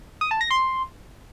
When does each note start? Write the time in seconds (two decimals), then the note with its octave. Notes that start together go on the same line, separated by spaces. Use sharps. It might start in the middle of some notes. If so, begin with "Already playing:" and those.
0.21 D#6
0.31 A5
0.41 A#6
0.51 C6